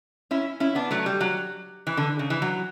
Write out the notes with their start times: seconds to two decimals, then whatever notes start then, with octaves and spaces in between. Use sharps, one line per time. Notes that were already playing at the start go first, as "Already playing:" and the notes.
0.31 C#4 E4
0.60 C#4 E4
0.75 B3 D4
0.91 F#3 A3
1.06 G3
1.21 F#3
1.87 E3
1.97 D3
2.19 C#3
2.30 E3
2.42 F#3